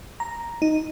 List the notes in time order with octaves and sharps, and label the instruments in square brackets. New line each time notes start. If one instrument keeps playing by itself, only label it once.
[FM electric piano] A#5
D#4